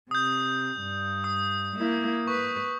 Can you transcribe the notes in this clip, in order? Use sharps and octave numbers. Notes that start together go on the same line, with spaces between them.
C3 D#6 G6
G2
D#6
A#3 E4
B4 C#6